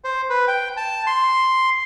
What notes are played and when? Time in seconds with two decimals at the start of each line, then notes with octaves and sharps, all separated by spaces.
0.04 C5
0.30 B4
0.48 G5
0.77 A5
1.07 C6